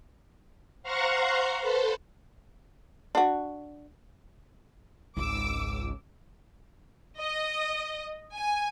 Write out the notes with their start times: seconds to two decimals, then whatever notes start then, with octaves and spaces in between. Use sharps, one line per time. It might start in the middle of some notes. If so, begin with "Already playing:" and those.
0.83 C5 F5 F#5 A#5 C6 C#6
1.60 A4 B4 C5
3.15 D4 F#4
5.17 G#1 C#2 D6 E6
7.19 D#5
8.36 G#5